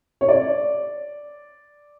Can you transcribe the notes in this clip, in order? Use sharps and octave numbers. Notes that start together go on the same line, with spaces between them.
C#5
D5